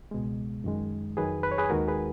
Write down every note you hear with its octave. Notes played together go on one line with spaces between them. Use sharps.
C#2 B2 G#3
F#2 D#3 G#3
F2 D#3 F#3 G#4 B4
B4
C#5
G#4 B4
D#2 D#3 G#3 F#4 A#4
G#4 B4